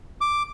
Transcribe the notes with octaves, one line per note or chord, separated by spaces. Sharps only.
D6